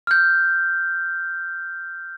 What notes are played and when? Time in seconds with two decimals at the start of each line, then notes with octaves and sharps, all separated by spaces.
0.07 F6 G6